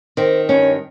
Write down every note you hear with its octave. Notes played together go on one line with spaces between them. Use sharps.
D#3 C4
G2 C#4